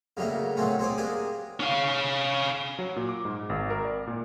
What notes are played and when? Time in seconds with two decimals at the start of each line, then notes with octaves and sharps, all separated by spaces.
0.17 C#3 F#3 G3 A3 A#3
0.57 A#2 F#3 A3 C4 C#4
0.79 C4 G#4 C#5 D5
0.98 A#3 D4 G4 G#4
1.60 C#4 F5
2.79 F#3
2.96 A#2
3.09 D6
3.25 G#2
3.50 G#1
3.70 A#4
3.85 D5
4.07 A#2